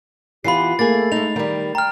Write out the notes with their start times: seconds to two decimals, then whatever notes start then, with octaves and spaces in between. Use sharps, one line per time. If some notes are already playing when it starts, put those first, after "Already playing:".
0.44 E3 B3 F4 G4 B5 C7
0.79 A3 A#3 G#4 A6
1.12 G#3 D#4 F7
1.36 D#3 G3
1.75 G5 A#5 F6